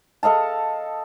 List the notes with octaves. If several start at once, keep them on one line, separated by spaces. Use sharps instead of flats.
A4 D#5 F5 A5